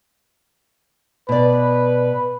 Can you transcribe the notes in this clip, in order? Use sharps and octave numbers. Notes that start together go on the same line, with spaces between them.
B2 B4 D5